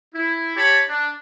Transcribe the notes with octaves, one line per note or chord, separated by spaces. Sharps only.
E4
G4 C#5 A5 B5
D4